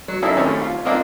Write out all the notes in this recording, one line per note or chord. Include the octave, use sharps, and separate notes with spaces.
F#3
A#3 C#4 D#4 E4 A4
D#2 A3 C4 C#4
F4
A#3 C4 D4 F4 A#4 D#5